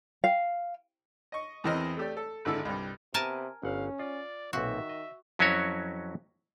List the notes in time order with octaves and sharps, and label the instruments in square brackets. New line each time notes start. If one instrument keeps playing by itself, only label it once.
[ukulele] F5
[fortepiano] D#5 C#6
E2 E3 C4 A#4 D#5 F6
A3 G4 D5
A4
G#1 D3 E4 A4
C2 G2
[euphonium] C3 [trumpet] B3 [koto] A#4 G#5 A5
[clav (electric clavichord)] G1 F#5 [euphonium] C#4 [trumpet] F5
[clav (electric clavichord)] F4 [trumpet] D5
[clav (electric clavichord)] B1 A#2 C4 [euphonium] D#3 [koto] F#4 [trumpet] E5
[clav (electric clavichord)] D#5
F2 F#3 C#4 E4 F#4 C#5